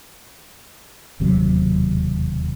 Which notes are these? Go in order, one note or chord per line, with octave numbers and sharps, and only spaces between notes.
E1 D#2 C3 F#3